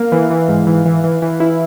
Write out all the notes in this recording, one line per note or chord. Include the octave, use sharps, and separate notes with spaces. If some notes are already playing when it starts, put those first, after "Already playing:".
Already playing: A#3 F5
E3
E3
G#2
E3
E3
E3
E3
E4